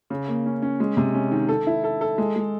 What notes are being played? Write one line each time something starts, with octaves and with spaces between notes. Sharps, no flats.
C#3
A#3
C#4
C#4
G#3
C3
C#4
D#3
A4
E4
A4
A4
G#3
G#3